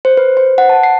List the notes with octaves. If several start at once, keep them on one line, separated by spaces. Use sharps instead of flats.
C5
B4
C5
F#5
A5
C7